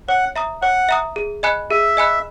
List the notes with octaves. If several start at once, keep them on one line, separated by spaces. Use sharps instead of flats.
C#5 F#5
E5 A#5 D#6
C#5 F#5
E5 A#5 D#6
G#4
D#5 G#5 B5 F#6
G#4 E5
D#5 G#5 B5 F#6